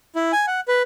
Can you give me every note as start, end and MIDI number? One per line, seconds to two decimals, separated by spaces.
0.15 0.32 64
0.32 0.46 80
0.47 0.61 78
0.68 0.82 71